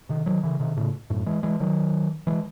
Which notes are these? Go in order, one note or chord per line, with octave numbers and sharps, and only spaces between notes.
C3 D#3
D#3 F#3
C#3 E3
C3 D#3
A2 C#3
F#2 A2
E3 G#3
E3 G#3
D#3 F#3
E3 G#3